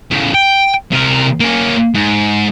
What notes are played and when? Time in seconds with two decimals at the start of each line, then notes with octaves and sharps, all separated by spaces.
0.11 A2 C#3
0.34 G5
0.92 C3 A#4
1.40 A#3 C#4
1.95 G#2